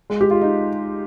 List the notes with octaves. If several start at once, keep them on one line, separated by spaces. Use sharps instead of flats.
G#3
G4
F4
D#4